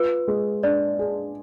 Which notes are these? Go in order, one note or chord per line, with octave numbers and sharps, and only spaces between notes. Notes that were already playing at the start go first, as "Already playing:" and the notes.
Already playing: F4 B4
G#3
D4 D5
G#4